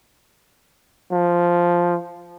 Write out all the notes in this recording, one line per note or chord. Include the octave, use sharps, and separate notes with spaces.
F3